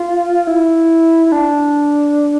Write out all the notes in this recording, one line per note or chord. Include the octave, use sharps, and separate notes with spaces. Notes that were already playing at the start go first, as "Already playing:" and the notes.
Already playing: F4
E4
E4
D4